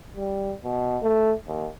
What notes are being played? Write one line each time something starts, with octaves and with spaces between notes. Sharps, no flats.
G3
B2
A3
D#2